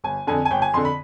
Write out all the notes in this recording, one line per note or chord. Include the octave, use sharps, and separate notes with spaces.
G1 G#5
F2 D3 G#5
G#5
G1 G5
G#5
F2 D3 C6
B5